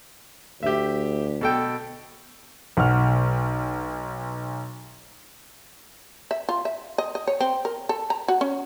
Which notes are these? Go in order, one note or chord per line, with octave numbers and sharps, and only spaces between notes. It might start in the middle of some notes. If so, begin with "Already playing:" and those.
D2 G4 E5
B2 A4 G5
B1 F#5 F6
E5
F4
E5
D#5
D#5
C#5
C4
A#4
A4
A#5
F#4
C#4